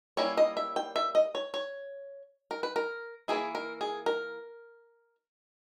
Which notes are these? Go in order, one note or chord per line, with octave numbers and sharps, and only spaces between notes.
G3 A#3 C#4 E4 C#5
D#5
E5
G5
E5
D#5
C#5
C#5
A#4
B4
A#4
E3 A#3 E4 G#4
A#4
G#4
A#4